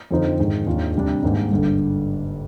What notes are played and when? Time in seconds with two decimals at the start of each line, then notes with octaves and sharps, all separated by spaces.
0.11 F2 D3 F3 C4 D#4
0.39 G#2 D#3 G#3
0.67 D#2 D#3 G#3 D4 F4
0.94 D2 C3 G3 D4
1.23 G#2 D#3 G3 A#3 D#4
1.51 G1 G2 D3